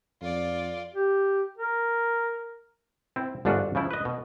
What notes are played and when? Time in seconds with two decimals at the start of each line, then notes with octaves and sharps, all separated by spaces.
0.21 F2 F4 D5
0.94 G4
1.58 A#4
3.16 C4 E4
3.45 G1 G#2 D4 F4 F#4
3.75 C#3 F3 E4
3.91 B4 D#5
4.05 B2